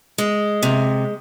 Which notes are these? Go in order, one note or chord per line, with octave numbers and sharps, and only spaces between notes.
G#3
C3